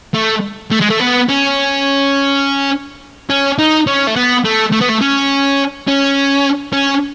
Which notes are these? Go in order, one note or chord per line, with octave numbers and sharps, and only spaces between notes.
A3
A3
G#3
A3
B3
C#4
C#4
D#4
C#4
A3
B3
A3
A3
B3
A3
C#4
C#4
C#4